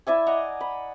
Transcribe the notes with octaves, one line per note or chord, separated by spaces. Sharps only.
E4 D5 E5 G#5
D5 D#5 F#5 A#5
B5